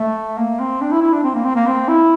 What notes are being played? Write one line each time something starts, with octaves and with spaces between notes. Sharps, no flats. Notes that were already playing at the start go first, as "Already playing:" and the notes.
Already playing: A3
A#3
C4
D4
E4
E4
D4
C4
A#3
C4
A#3
C4
E4